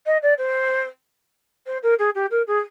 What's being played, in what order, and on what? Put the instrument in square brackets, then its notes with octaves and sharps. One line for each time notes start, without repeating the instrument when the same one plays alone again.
[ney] D#5
D5
C5
C5
A#4
G#4
G4
A#4
G#4